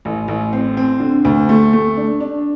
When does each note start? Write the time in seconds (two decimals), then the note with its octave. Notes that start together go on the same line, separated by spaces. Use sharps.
0.05 A1
0.28 A1
0.53 C4
0.77 C4
1.00 D3
1.25 D2
1.49 A3
1.73 A3
1.97 D4
2.20 D4